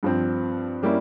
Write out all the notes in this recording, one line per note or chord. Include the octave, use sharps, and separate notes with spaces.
G2 F3 C4
G3 A#3 C#4 E4